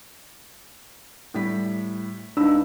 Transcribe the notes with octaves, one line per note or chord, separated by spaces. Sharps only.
A2 G3 B6
C#2 D4 D#4 B5 E6